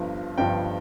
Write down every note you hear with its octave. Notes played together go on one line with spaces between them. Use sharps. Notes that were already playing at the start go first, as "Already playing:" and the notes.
Already playing: G1 G2 F3
G1 G2 F3 G5